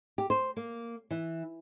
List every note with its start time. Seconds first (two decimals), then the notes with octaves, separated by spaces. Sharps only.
0.18 G4
0.30 C5
0.57 A#3
1.11 E3